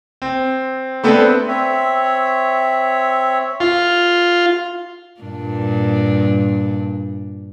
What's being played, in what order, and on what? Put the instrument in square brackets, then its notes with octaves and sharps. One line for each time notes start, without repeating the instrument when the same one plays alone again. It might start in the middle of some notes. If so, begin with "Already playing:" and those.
[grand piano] C4
A3 B3 C4 D4 A4 B4
[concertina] C4 C#5 E5
[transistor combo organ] F4
[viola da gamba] G2 A#2 D4